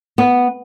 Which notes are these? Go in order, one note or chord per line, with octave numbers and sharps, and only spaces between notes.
B3